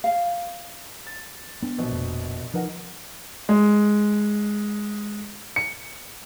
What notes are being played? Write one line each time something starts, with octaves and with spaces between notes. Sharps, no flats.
F5
A6
B3 D4
A#1 B2 F3
F1
F3 D#4 A#4 F#5
G#3
C#7